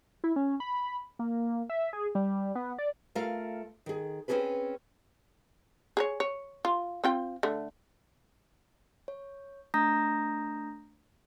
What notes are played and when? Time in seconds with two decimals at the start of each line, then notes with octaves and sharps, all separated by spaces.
0.24 E4
0.36 C#4
0.60 B5
1.19 A#3
1.70 E5
1.93 G#4
2.15 G3
2.55 B3
2.78 D5
3.15 A3 F4 A#4 F5
3.86 D#3 G#4
4.28 C4 C#4 D#4 F#4 G#4 B4
5.97 G#4 A#4 C#5
6.20 C#5
6.65 F4
7.04 C4 F4 G5
7.43 D3 A3
9.08 C#5
9.74 A3 D4 A#5 D#6 G6 A#6